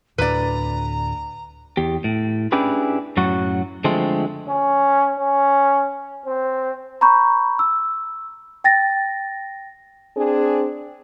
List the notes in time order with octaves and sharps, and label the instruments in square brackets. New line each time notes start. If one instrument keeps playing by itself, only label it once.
[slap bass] D2 A2 [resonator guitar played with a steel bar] B4 D5 [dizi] A#5
[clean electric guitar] E2 G4
A2
C#4 D4 E4 G4 G#4 B4
F#2 A2 F#3 F#4
D3 F3 G#3 A3 C4
[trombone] C#4
C#4
C4
[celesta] A#5 B5 C#6 G6
E6
G5 A6 A#6
[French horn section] C4 D4 G#4